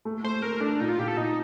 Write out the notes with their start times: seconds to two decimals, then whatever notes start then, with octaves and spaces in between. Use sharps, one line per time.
0.05 A3
0.24 A3 C5
0.42 A3 A#4
0.61 A3 D4
0.80 A#2 D#4
0.89 F4
0.99 A#2 G4
1.08 A4
1.17 A#2 D#4